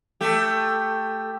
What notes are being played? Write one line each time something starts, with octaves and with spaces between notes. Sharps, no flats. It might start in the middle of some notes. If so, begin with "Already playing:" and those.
A3 G4